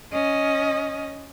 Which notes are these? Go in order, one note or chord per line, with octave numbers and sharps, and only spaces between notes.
C#4 D#5